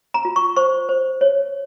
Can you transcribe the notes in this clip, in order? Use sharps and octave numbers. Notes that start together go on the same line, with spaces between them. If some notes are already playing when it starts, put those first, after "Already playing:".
A#5
F4
C#6
C5 C#6
C5
C#5